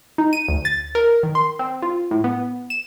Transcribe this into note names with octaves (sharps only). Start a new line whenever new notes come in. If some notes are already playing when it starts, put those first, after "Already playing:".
D#4
D#7
D2
A6
A#4
D#3
C6
C4
F4
A2
B3
E7